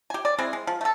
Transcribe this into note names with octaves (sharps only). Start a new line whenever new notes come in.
G4 G#5
D5
G#3 C4 E4 G#4
G#3
F3
A3 A4